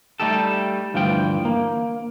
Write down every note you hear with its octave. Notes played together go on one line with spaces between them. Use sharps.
G3 A3 D#4 G4 A4
D2 G2 E3 F3 G5
A#3